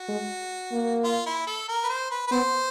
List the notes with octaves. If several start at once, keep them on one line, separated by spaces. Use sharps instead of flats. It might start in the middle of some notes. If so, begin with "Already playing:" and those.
Already playing: F#4
G#3
A#3
F4
E4
A4
A#4
B4
C5
B4
B4
B3 C5